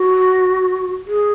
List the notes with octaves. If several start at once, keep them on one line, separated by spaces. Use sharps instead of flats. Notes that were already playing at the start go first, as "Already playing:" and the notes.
Already playing: F#4
G#4